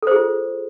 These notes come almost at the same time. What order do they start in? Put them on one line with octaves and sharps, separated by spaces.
A4 C5 G#4 F4